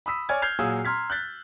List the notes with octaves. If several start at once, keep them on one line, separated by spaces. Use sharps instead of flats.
B5 D#6 E6 B6
C#5 D5 G#5 F6 G#6
F6 G6 G#6 C7 F7
A#2 F#3 G#4 F5 D#6 E6
A#5 C6 F6 G#6 B6
F#6 G6 A6 B6